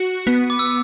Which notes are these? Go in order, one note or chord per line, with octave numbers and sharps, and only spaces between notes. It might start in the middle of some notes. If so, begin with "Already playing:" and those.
Already playing: F#4 C#7
B3
D6
E6